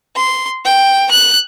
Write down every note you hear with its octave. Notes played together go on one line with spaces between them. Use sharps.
C6
G5
F#6